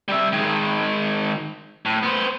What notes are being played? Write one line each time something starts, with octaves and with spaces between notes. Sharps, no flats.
G3 E5
D#3 G#3
A2
B3 C5